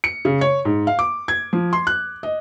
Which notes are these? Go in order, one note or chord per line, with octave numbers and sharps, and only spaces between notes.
C#7
C#3
C#5
G#2
F5
D6
G#6
F3
C6
F#6
D#5